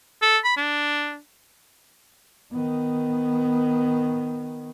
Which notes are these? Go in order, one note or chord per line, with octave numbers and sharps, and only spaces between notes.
A4
B5
D4
D#3 B3